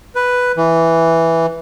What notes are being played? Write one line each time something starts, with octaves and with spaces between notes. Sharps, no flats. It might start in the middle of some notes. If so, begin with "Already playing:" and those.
B4
E3